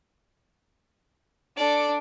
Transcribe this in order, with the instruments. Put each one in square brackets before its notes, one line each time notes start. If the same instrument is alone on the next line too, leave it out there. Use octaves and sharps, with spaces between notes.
[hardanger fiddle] D4 [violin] A4 D5